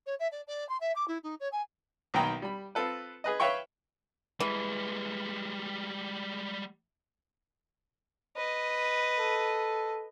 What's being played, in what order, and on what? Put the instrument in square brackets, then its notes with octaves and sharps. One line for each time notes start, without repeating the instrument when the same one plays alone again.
[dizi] C#5
E5
D5
D5
C6
E5
D6
E4
D#4
C#5
G#5
[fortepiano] B1 D#3 A#3 G5 A#5 B5
G3 B5
C4 F4 A4 B4
G#4 B4 D#5
B4 C#5 E5 F5 G5 C#6
[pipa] E3 [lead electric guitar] G3 G#3
[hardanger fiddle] B4 D#5
[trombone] A4